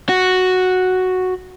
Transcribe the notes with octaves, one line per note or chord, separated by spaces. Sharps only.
F#4